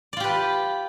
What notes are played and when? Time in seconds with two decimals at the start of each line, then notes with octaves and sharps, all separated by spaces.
0.13 D5
0.17 F4
0.20 G4
0.24 B4